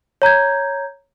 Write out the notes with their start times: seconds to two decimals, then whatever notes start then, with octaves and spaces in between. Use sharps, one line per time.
0.22 C#5 A#5 G6 G#6